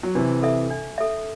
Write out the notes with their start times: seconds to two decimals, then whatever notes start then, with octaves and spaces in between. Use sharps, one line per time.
0.03 F#3
0.15 C3 E3 D4
0.43 A4 E5
0.71 D4
0.98 A4 E5